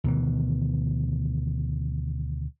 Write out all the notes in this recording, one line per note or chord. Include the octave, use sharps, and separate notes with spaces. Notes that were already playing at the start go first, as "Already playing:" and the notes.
D2 B2 D#3 E3